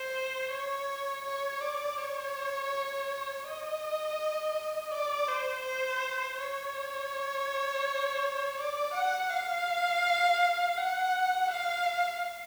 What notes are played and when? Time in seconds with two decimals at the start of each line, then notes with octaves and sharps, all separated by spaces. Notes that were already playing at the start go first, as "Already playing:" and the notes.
Already playing: C5
0.51 C#5
1.25 C#5
1.60 D5
1.97 C#5
3.45 D#5
4.91 D5
5.28 C5
5.64 C5
6.37 C#5
8.57 D5
8.93 F#5
9.30 F5
10.78 F#5
11.51 F5